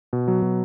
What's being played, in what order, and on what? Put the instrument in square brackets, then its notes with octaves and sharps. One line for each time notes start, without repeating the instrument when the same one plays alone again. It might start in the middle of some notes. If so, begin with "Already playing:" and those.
[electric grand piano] B2
F#3
B2